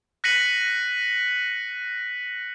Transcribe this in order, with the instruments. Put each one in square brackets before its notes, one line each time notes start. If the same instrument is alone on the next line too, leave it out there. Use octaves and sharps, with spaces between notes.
[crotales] F#6 A#6 B6 C#7 D#7 F#7